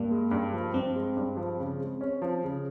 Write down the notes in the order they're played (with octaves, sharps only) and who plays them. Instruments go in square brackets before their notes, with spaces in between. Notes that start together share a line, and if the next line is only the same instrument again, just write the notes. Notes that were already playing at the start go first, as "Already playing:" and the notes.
Already playing: [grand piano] G2 [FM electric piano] A#3
[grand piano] G#3
G2
F3
[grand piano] G2 [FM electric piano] C4
[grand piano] G#3
G2
F3
C#3
G#3
C#4
F3
C#3